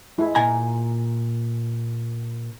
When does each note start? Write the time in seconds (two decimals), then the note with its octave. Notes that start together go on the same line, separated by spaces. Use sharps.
0.18 G#3 E4
0.35 A#2 G#5 A#5